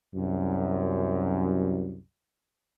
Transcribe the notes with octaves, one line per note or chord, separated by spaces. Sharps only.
C2 F#2